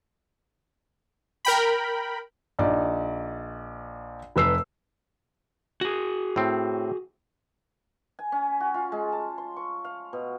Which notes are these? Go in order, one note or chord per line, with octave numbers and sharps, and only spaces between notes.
A#4 G5 B5
A#1 D#4 D5
F1 B4 E6 C7
F#4 G#4
A2 C4
G#5
C#4
F#4
F4
G#3
A5
C6
C#6
F5
B2